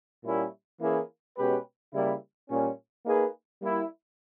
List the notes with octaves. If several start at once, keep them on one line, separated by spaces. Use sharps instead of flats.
A#2 G3 A#3 C#4 E4
E3 A#3 C#4 E4 G#4
B2 G#3 C#4 G4 B4
C#3 G3 A#3 E4
A#2 G3 C#4
A#3 D#4 G#4 B4
G3 A#3 E4